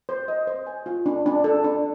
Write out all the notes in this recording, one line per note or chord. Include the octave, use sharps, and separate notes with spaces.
C5
D#5
C5
G#5
F4
D4
D4
A4
D4